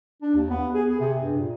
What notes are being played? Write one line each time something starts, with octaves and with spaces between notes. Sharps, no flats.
D4
D#2
B3
G#4
G#4
C3
G2
A#2